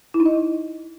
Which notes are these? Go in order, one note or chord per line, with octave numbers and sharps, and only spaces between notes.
E4
D#4
D#5